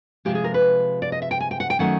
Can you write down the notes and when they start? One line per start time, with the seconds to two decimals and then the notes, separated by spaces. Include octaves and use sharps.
0.25 C3 F3 G#3 G4
0.35 G#4
0.44 A#4
0.54 B4
1.02 D5
1.12 D#5
1.22 E5
1.31 G5
1.40 G#5
1.51 G5
1.60 F#5
1.70 G5
1.79 D#3 F#3 A3 C#4 F#5